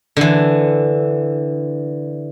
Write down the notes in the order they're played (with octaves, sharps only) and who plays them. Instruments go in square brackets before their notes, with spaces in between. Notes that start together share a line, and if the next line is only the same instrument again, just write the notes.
[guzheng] D3 E3